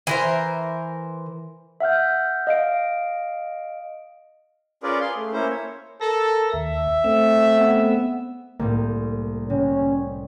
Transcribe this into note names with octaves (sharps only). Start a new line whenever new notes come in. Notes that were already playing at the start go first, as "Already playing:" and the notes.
E3 A#4 C5
E5 F#5 F6 G6
D#5 F5 D7
C#4 F4 G#4 A#4 B4 D5
G#4 F5 C6
A3
A#3 C#4 E4 C5
C#5
A4 A#4 A#6
D#2 E5
A3 C4 E6
B3
C2 A2 A#3
C3 C#4